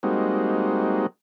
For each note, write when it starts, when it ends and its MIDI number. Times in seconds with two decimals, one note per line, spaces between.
0.03 1.07 55
0.03 1.07 56
0.03 1.07 58
0.03 1.07 60
0.03 1.07 63
0.03 1.07 66